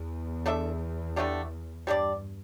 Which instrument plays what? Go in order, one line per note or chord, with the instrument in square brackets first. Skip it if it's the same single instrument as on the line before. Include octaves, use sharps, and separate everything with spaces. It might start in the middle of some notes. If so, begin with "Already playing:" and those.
Already playing: [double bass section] E2
[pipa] A3 D4 A4 E5
D3 A3 D4 G4
[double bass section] G2 [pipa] G3 D4 A4 D5